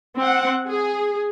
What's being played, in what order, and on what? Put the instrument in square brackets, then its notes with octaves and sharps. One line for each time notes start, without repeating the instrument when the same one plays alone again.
[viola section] C4 F#5
G#4